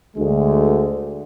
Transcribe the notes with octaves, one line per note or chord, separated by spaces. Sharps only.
D2 G#3